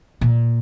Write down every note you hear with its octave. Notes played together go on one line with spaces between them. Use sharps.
A#2